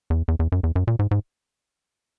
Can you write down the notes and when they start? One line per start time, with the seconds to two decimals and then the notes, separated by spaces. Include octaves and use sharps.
0.10 E2
0.28 E2
0.39 E2
0.52 F#2
0.63 E2
0.76 F#2
0.87 A#2
0.99 G#2
1.11 G#2